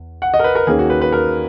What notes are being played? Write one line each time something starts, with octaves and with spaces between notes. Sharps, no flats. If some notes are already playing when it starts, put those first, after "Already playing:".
Already playing: E2
F#5
D#5
A#4
B4
A#4
D#2 D#3 A#3 C#4 G#4
F#4
B4
B4
A#4